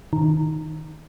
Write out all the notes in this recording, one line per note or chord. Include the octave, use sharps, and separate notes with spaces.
D#3